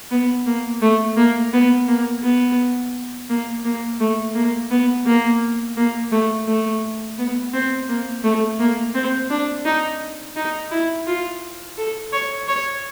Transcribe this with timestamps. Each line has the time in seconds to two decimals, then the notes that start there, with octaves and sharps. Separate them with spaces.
0.11 B3
0.46 A#3
0.82 A3
1.17 A#3
1.53 B3
1.88 A#3
2.23 B3
3.30 A#3
3.65 A#3
4.00 A3
4.35 A#3
4.70 B3
5.06 A#3
5.77 A#3
6.12 A3
6.47 A3
7.18 B3
7.53 C4
7.89 A#3
8.24 A3
8.60 A#3
8.95 C4
9.30 D4
9.65 D#4
10.36 D#4
10.71 E4
11.07 F4
11.77 A4
12.13 C#5
12.48 C#5